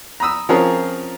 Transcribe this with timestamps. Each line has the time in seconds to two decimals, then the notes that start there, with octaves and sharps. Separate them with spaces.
0.20 A#5 B5 D#6 E6
0.49 F3 C4 C#4 F4 G#4 A#4